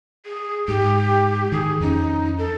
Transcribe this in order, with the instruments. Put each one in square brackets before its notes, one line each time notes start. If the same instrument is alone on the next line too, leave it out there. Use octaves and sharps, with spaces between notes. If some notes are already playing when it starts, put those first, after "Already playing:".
[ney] G#4
[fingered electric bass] G#2 [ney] G4
[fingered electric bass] D#3 [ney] G#4
[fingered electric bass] F2 C#4 [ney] D#4
[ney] A4